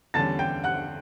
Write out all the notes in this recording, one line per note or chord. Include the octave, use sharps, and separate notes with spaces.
E2 D3 G3 C#4 A5 A6
G5 G6
F#5 F#6